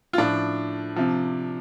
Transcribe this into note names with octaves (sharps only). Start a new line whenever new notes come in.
F4
A2 F3 D4
C3 F3